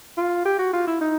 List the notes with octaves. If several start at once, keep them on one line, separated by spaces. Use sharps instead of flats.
F4
G4
F#4
F4
E4
D#4